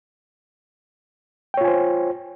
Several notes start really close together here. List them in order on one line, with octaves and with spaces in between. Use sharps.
G5 C#5 F4 G#5 C5